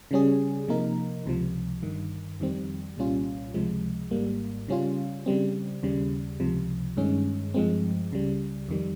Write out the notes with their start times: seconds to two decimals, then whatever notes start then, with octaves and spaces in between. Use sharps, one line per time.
0.11 C#3 G3 C#4 G#4
0.68 C3 F3 A#3 D#4 A#4
1.26 C#2 C3 F3
1.82 G1 G2 D#3
2.40 F2 D#3 G3 C4
2.97 C2 A#2 G3 C#4 F4
3.54 C#2 C3 F3 G#3
4.11 G#1 G#2 G3 A#3
4.68 C#3 G3 C#4 F4
5.26 C#3 G3 C4
5.83 D#2 C#3 G3
6.40 C#2 C3 F3
6.97 G2 D#3 G#3 C#4
7.54 G2 F3 G#3 C4
8.12 C#2 C#3 G3
8.69 F2 D#3 G3